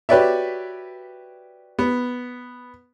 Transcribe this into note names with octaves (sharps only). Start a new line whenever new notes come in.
F#4 G4 B4 C#5 D5 E5
B3